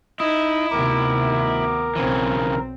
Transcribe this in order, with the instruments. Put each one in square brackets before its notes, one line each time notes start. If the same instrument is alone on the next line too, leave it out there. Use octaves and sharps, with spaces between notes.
[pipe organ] D#4 D#5 [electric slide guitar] E4
[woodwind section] D2 B3 D6 [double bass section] C3 D#3 [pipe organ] A#4
[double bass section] B1 C4 [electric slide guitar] C#3 E3